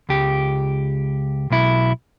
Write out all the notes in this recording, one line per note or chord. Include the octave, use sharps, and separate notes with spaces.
C#2 G4
B1 E4